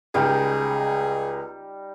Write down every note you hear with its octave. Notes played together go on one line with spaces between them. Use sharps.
C#2 G3 D#4 G#4